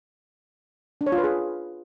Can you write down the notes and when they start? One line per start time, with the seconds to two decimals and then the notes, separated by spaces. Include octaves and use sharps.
1.01 D4
1.06 C#5
1.12 F4
1.18 B4
1.24 G#4